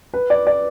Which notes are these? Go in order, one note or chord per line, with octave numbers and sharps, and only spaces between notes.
B4
D5
D5